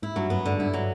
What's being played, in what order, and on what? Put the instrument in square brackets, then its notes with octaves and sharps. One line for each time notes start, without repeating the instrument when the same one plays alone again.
[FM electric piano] G#2 [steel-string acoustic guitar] E4
[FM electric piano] G2 [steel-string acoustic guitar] F#3
[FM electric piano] F#2 [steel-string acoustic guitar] B3
[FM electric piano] G#2 [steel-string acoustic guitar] D3
[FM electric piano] G2 [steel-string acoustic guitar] E4
[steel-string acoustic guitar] F#3